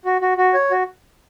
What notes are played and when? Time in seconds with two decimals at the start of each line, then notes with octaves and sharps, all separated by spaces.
0.05 F#4
0.21 F#4
0.37 F#4
0.54 C#5
0.71 F#4